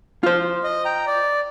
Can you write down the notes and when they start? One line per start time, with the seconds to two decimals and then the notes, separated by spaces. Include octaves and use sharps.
0.23 F4 C5
0.64 D#5
0.85 G5 A#5
1.07 D5